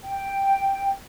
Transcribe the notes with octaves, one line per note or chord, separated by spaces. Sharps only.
G5